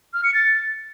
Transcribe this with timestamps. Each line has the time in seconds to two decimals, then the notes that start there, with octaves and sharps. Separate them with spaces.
0.13 F6
0.24 C#7
0.34 A6